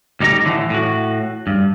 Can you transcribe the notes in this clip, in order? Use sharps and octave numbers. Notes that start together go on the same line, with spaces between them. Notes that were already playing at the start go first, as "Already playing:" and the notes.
D2 G3 D#4 G4 A#5
A2 D3 E3
A2 F#4
G2